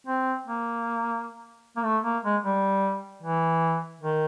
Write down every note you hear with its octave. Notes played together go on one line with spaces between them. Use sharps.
C4
A#3
A#3
A3
A#3
G#3
G3
E3
D#3